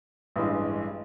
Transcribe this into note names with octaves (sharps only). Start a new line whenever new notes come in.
A1 G2 E3 G#3